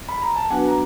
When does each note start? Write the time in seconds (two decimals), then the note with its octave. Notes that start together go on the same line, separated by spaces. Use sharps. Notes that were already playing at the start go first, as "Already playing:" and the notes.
0.09 B5
0.22 A#5
0.36 A5
0.50 F#3 B3 D4 F#4 B4 F#5 G#5
0.67 A#5